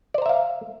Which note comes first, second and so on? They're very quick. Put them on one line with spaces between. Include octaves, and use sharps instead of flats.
D5 C5 A#5 E5 F5